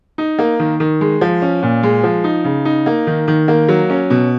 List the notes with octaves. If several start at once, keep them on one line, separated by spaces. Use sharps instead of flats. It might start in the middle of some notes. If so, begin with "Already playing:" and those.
D#4
A#3
D#3
D#3
G#3
F3
C#4
A#2
G#3
F3
D#4
C#3
D#4
A#3
D#3
D#3
A#3
F#3
C#4
B2